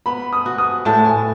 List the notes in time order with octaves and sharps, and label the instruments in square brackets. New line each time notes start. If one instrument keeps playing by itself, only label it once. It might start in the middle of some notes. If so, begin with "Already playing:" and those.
[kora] B3 [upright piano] B5
[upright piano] D#6
[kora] F#4
[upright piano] D#6
[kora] A2 [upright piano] A5
[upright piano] G#5